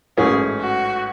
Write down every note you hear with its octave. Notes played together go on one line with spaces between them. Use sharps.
A1 G#2 F#3 A3 C#4 G#4
F#4